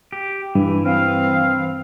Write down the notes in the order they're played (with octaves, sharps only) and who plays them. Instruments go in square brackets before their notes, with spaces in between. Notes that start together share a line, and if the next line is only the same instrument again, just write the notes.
[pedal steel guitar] G4
[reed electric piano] G2 [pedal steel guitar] E3
[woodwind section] C4 F5